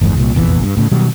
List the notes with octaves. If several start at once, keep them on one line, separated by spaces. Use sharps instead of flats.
G1 E2 G#2
C2 A#2
F1 A#1 E2 E3
G2
A2 C#3
B2 D#3 F#3 G3